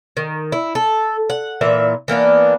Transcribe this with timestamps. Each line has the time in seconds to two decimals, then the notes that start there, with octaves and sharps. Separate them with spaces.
0.17 D#3
0.52 E4
0.75 A4
1.30 F#5
1.61 A#2 E3 E5
2.08 E3 A#3 B3 D4